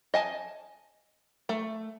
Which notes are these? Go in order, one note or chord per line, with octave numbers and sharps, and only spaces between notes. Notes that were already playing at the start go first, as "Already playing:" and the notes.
D#5 G#5 A5
A3